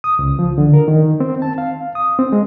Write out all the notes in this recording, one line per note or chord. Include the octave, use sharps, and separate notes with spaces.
D#6
C#2
F3
D3
A#4
D#3
C4
A5
F5
D#6
C4
G#3